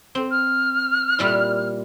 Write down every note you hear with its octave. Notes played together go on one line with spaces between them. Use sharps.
C4
F6
A#2 G3 E4